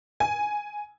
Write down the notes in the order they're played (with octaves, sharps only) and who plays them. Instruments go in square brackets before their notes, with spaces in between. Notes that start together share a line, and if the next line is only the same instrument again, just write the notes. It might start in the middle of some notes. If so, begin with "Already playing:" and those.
[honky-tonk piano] G#5